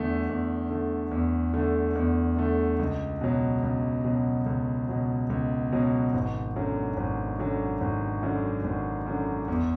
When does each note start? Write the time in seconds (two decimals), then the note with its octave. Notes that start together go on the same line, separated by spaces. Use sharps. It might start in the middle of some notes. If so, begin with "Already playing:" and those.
Already playing: E2 D3 A3
0.29 E2
0.70 D3 A3
1.11 E2
1.54 D3 A3
1.95 E2
2.37 D3 A3
2.79 C#2
3.21 B2 F#3
3.63 C#2
4.05 B2 F#3
4.46 C#2
4.89 B2 F#3
5.30 C#2
5.72 B2 F#3
6.13 G#1
6.56 F#2 D3 F#3
6.97 G#1
7.39 F#2 D3 F#3
7.81 G#1
8.23 F#2 D3 F#3
8.64 G#1
9.06 F#2 D3 F#3
9.48 E2